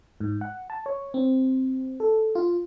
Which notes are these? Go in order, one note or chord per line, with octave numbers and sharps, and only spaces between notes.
G#2
F#5
A5
C#5
C4
A4
F4